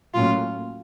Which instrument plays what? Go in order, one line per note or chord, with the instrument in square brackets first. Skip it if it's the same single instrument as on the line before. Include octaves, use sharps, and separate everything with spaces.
[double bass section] A2 F#3 A#3 C#4 [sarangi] F4